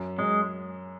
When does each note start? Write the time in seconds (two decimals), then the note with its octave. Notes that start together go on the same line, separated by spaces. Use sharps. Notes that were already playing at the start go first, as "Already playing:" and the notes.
Already playing: F#2
0.18 F#2 G#3